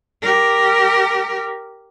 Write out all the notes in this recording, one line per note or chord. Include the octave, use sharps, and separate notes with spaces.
G4 A#4